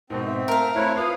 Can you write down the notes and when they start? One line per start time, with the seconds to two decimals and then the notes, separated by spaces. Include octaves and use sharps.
0.10 G#2 B2 C4 A#4
0.26 E5
0.48 A3 A#4 F5
0.76 A3 C4 E4 C#5 F#6
0.96 F4 B4 F5 D#6